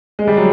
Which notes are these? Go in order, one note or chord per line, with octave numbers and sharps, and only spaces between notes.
G#3
G3
F#3